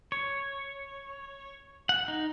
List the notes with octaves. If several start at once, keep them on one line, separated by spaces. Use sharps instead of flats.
C#5
F#5
D#4